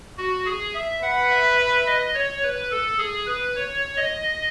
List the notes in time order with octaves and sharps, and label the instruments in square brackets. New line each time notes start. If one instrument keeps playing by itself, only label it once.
[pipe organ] F#4
G#4
E5
[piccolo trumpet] B4 [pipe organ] F#5
[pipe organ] E5
E5
D#5
C#5
B4
A4
G#4
B4
C#5
D#5